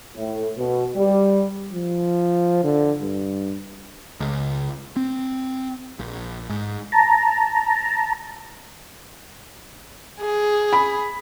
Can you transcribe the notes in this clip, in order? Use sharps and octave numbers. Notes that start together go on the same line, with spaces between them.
A2
B2
G3
F3
D3
G2
C#2
C4
A#1
G#2
A5 A#5
G#4
B5